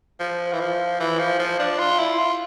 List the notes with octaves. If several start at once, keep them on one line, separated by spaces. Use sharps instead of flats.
F3
E3
F3
E3
F3
F3
D4
F4
E4
F4